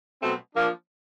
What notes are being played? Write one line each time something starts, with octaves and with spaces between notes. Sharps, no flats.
B2 F#3 A3 C4
F3 A#3 D4